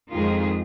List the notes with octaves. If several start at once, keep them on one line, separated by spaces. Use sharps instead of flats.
F2 D#3 G#3 F4 G#4